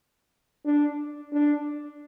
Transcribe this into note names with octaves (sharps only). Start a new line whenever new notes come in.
D4
D4